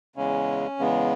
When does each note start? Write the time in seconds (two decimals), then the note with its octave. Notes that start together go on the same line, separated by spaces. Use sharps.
0.16 E2 C#3 G#3 C#4
0.79 E2 C#3 G#3 B3